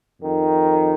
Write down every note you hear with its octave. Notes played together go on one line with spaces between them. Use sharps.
F2 D#3